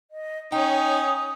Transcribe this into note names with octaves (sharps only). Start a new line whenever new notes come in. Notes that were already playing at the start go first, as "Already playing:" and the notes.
D#5
C#4 D#4 C#5 G5 D#6